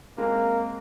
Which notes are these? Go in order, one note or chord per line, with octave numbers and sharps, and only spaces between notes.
G#3 A#3 C4